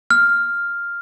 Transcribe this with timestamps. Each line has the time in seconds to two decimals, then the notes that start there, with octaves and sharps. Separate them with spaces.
0.11 F6